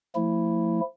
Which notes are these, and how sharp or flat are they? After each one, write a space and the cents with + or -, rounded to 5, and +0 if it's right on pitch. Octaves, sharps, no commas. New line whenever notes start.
F3 +5 A3 +35 E4 +0